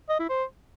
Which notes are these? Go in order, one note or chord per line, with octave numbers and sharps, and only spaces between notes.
D#5
E4
C5